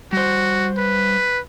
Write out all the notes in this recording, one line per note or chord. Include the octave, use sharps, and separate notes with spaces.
G3 F#4 C5
B4